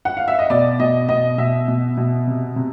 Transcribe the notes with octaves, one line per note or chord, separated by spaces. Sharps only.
F#5
F5
E5
D#5
B2 D5
B2 D#5
B2 D#5
B2 E5
B2
B2
C3
C3